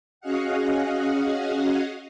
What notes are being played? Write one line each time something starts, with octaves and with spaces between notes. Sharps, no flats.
C#4 F#4 G#4 D#5 F5 F#5